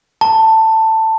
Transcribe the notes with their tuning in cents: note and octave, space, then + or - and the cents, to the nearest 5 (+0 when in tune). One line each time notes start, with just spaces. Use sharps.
A5 +15